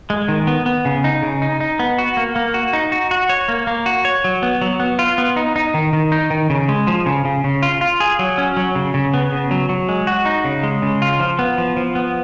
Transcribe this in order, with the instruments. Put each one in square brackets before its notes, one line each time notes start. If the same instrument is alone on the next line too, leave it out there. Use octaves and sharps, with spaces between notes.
[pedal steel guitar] G#3
D#3
B3
B3
C#3
D#4
C#3
D#4
D#4
B3
F#4
A#3
A#3
F#4
D#4
F#4
F#4
C#5
A#3
A#3
F#4
C#5
F#3
B3
F#3
B3
F4
B3
D#4
D#4
D#3
D#3
D#4
D#3
C#3
G#3
F3
C#3
C#3
C#3
F4
F4
G#4
F#3
C#4
F#3
C#3
C#3
B3
C#3
F#3
F#3
G#3
F#4
D#4
C#3
G#3
C#3
F4
F3
B3
F3
F3
B3